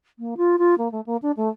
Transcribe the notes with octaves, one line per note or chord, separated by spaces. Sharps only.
A#3
F4
F4
A#3
A3
A#3
D4
A3